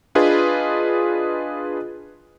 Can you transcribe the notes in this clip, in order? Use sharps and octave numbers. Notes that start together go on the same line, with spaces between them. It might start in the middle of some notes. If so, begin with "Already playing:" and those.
D4 F4 G#4 B4 D#5